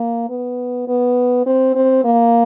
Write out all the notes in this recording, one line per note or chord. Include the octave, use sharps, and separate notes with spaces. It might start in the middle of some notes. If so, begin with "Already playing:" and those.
Already playing: A#3
B3
B3
C4
C4
A#3